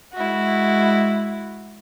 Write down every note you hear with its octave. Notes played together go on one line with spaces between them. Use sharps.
G#3 E4 F#4